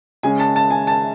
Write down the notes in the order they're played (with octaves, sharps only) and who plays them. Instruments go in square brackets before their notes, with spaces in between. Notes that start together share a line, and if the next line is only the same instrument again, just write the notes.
[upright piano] C#3 G#3 C#4 [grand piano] G#5
[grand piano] A5
A5
G#5
A5